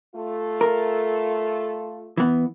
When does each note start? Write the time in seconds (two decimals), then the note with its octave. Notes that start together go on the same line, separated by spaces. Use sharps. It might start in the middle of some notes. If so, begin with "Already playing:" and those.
0.14 A3 F4 A4
0.61 A#4
2.17 E3 B3